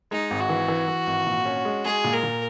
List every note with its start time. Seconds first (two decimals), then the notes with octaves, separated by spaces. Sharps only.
0.11 G#3 D#4
0.31 G#1
0.40 F#4
0.49 E3
0.68 E3
0.88 E3
1.07 G#1
1.27 A#2
1.45 C#4
1.65 G#3
1.85 G#3 G#4
2.04 A#2
2.13 A#4
2.23 A#2